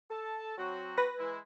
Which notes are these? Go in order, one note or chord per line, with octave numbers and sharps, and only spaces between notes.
A4 A5
F#3 C4 F#4
B4 A#6
E3 G#3 E4